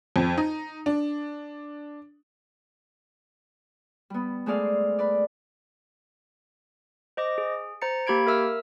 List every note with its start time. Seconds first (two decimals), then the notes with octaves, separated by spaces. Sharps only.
0.16 F2
0.38 D#4
0.86 D4
4.10 G3 B3
4.46 G#3 A3 C4 G#4 D5 F5
4.99 B4 D5
7.17 C5 D#5 D6 A#6
7.38 G#4
7.82 C5 A#5 A6 C#7
8.07 A#3 G4 B5 G#6 D7
8.27 A#4 E5 E6 F6